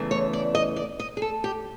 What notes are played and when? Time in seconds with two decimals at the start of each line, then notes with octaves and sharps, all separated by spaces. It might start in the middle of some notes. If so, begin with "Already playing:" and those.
Already playing: E2 C#3 E3 A3
0.11 C#5
0.33 D5
0.55 D#5
0.76 D5
1.00 D#5
1.17 G#4
1.22 A4
1.44 G4